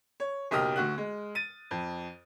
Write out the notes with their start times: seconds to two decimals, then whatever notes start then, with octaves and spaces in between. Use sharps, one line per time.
0.20 C#5
0.51 F#1 B1 G4 D#5 D#6 F6
0.76 D2 F#4 F#6
0.98 G#3
1.35 A6 D#7
1.71 F2